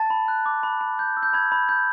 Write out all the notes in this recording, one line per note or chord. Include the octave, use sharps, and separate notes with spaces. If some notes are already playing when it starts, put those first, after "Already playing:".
Already playing: A5 A6
B5
F#6
D6
B5
B5
G6
E6
G6
B5 G#6
B5
G6